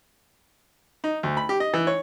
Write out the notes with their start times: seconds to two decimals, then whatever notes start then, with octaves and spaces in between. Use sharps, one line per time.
1.04 D#4
1.23 D2
1.37 B5
1.49 G4
1.60 D#5
1.74 E3
1.87 C#5